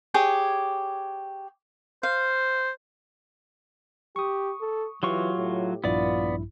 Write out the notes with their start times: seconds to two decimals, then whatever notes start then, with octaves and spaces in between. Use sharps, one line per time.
0.14 G4 G#4 C#5
2.03 C5 F5
4.16 G4 C#6 D#6
4.60 A4
5.03 E3 F#3 F4 G4 C#6
5.37 A2
5.84 A#1 G2 B3 E4 F4 D5